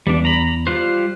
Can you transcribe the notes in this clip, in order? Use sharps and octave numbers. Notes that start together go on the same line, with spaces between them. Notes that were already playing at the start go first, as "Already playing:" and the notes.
E2 G3 D4
A#5 B5
G3 F4 C5 F#6